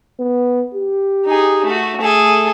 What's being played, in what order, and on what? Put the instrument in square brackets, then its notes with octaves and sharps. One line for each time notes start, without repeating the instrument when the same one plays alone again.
[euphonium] B3
G4
[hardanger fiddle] D#4 G#4
A3 F#4
[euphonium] A3 [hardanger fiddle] G#4 A4